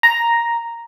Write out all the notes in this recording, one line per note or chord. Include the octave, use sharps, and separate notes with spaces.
A#5